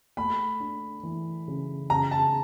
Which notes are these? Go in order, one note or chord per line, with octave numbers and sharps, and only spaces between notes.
A3 B5
D4
E3
C#3
C#3 A#5
A5